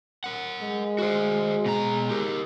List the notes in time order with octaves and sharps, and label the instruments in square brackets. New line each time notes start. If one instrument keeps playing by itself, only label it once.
[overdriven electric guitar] A#4 F#5
[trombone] G#3
[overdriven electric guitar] F#4 C5
B2 A#5
G4 A#4